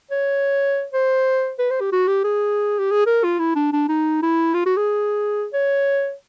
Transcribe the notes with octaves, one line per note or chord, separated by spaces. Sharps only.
C#5
C5
B4
C5
G4
F#4
G4
G#4
G4
G#4
A#4
F4
E4
D4
D4
D#4
E4
F4
F#4
G#4
C#5